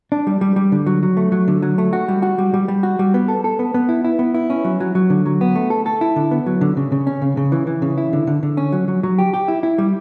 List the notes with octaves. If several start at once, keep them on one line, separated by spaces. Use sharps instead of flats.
D4
G3
G3
G3
D3
F#3
F#3
A3
F#3
D3
F#3
A3
F#4
G3
F#4
G3
G3
G3
F#4
G3
B3
A4
A4
B3
B3
E4
E4
B3
E4
C#4
F#3
F#3
F#3
D3
F#3
B3
A3
A4
A4
E4
D3
B3
F#3
D3
C#3
C#3
C#4
C#3
C#3
E3
E3
C#3
E4
D3
D3
D3
C#4
F#3
F#3
F#3
G4
G4
E4
E4
G3